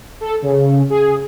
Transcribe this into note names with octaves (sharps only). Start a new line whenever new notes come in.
A4
C#3
G#4